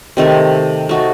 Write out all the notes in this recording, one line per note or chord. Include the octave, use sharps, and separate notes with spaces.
C3 D#3 A3
A3 D#4 F#4